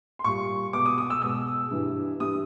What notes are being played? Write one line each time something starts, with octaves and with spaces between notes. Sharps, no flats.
C6
A#2 G3 C#6
B2 G#3 D6
D#6
D#6
E6
B2 G#3 E6
G2 E3 G3
G2 E3 G3 D#6